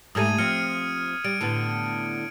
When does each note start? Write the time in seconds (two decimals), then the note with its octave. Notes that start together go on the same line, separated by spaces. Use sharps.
0.15 G#2 G3 A3 D#6 G#6 D#7
0.38 F3 C4 F6 C#7
1.24 G3 D7
1.41 A2 D3 B3